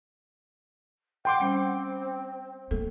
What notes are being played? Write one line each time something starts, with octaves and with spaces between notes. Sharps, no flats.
F#5 G5 C6 D6
G3 C4 C#4
A3 A#3 A4